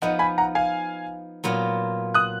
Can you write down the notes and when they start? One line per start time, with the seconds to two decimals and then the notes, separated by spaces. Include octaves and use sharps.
0.02 F3 B3 D#4 D#5 F#5
0.19 G#5 B5
0.38 F#5 A#5
0.55 F5 G#5
1.44 A#2 F#3 B3 F4
2.14 D#6 F#6